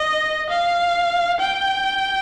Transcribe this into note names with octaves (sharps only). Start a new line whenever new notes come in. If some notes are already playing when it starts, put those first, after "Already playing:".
Already playing: D#5
F5
G5